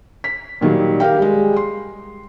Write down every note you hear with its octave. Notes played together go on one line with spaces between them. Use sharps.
B6
A#2 D#3 F#3 G3
G4 A#4 F5 G5
G3 G#3
C6